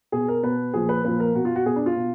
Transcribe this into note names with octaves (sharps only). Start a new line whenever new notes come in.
B2 G#4
A#4
B2 B4
A#2 F3 G#4
B4
A#2 F3 B4
A#4
B2 F#4
F4
F#4
B2 G#4
D4
F4
B2